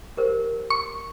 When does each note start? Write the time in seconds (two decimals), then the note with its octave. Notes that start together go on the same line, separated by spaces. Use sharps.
0.17 G4 A#4 C5
0.70 C#6